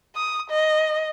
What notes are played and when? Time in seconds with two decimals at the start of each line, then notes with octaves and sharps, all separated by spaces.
0.16 D#6
0.51 D#5